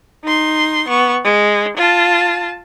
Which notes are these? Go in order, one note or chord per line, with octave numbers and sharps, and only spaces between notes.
D#4 C6
B3 C#6
G#3
F4 A5